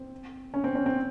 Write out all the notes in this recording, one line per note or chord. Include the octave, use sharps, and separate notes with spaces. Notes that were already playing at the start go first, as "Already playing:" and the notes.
Already playing: C4
C#4
C4
C#4
C4